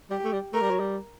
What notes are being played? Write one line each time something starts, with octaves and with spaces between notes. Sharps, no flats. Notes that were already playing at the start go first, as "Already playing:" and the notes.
G3 G4
A3
G3
A3 A#4
G3
F#3
G3